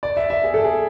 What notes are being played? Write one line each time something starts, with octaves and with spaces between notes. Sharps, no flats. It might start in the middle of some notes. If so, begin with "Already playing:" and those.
D5
E5
E5
G#4
A4
G#4